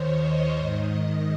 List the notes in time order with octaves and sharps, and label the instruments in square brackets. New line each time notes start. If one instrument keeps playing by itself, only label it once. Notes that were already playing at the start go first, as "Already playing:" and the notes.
Already playing: [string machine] D#2 D#3 C5 C#5
D#5
G#2 D#3